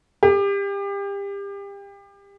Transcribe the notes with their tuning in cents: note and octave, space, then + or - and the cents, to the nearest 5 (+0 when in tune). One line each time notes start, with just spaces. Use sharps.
G4 +30